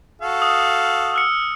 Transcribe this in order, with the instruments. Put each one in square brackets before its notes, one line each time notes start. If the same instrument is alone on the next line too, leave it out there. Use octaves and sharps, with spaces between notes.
[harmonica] F#4 A4 F5
[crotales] D#6
E6 F6 C#7